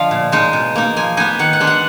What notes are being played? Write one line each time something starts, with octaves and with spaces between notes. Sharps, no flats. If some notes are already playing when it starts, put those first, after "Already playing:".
Already playing: D3 F3 D#5 F5
A#2
G#3 D#4
B2
A#3 D#4
F3 G#5
B3 D#4 G#5
D#3 F#5
F#5
G#3 D4
F#5